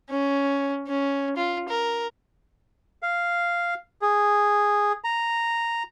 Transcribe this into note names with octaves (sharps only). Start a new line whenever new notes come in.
C#4
C#4
F4
A#4
F5
G#4
A#5